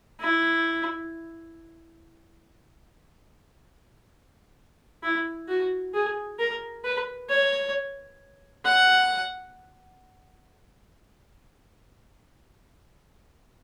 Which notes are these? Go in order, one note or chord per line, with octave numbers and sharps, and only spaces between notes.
E4
E4
F#4
G#4
A#4
B4
C#5
F#5